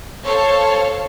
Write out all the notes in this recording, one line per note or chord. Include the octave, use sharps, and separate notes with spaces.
A4 C5 C#5 F5